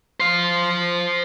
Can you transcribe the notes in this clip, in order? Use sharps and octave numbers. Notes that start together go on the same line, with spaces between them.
C5 F5